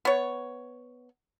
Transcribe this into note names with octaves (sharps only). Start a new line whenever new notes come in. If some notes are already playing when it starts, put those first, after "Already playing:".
B3 C#5